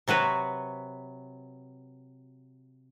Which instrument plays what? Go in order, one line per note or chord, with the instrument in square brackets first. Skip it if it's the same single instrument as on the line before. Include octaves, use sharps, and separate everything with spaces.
[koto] C3 F#3 F#4 B4